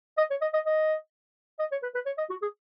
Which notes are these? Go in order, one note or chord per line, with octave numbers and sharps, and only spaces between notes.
D#5
C#5
D#5
D#5
D#5
D#5
C#5
B4
B4
C#5
D#5
F#4
G#4